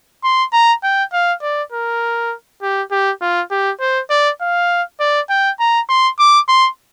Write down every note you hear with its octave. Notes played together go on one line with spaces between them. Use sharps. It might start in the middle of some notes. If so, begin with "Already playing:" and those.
C6
A#5
G5
F5
D5
A#4
G4
G4
F4
G4
C5
D5
F5
D5
G5
A#5
C6
D6
C6